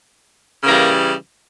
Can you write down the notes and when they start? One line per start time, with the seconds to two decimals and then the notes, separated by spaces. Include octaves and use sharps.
0.63 C#3 E3 G3 A#3